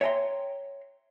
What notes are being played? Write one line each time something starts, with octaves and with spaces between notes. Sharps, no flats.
C#5 E5 G5 G#5 A#5 C6